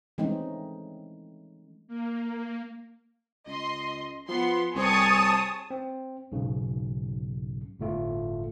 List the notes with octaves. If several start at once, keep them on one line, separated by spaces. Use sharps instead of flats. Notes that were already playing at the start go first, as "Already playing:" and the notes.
E3 G#3 A3 C4 C#4 D#4
A#3
C#2 D#5 C6
F3 B3 C6
C2 C4 G#4 C#5 A5 D#6
C4
B1 G#2 C#3
G1 A2 A3 F4